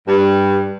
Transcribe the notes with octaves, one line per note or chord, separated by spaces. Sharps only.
G2